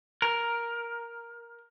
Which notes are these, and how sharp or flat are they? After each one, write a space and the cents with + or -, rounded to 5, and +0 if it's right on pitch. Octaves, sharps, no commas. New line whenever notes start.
A#4 +5